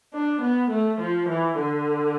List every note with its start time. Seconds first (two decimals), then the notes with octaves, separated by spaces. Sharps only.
0.13 D4
0.42 B3
0.71 A3
1.00 F3
1.29 E3
1.59 D3